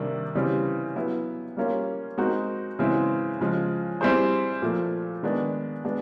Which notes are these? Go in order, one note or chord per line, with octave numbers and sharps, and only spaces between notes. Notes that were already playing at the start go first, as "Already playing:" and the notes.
Already playing: C3 D#3 G3 A#3 D4
C#3 E3 G3 C4
F#3 B3 E4
G3 A#3 C#4 F4
G#3 C4 D#4 F#4 A#4
C#3 E3 G#3 C4 E4
C#3 F3 G#3
G3 C4 E4 G#4 C5
A#2 F3 A3
D#3 G#3 B3 D4
G#3 B3 D4